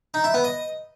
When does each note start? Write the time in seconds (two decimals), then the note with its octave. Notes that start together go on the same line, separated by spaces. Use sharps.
0.14 D#4
0.24 E4
0.34 B3
0.44 D#5